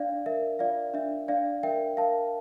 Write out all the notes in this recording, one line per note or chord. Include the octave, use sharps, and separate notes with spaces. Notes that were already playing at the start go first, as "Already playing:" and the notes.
Already playing: D4 D5 F5
A#4 E5
F4 D5 F5
D4 E5
D4 D5 F5
A#4 E5 G5
A#4 F5 A5